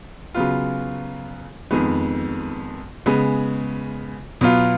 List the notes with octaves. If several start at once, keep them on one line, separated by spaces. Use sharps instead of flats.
C#3 F#3 B3 F4
F2 D#3 G#3 B3
C#3 G#3 B3
B2 F#3 B3 F4